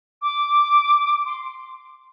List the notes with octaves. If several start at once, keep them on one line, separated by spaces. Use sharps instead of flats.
D6
C6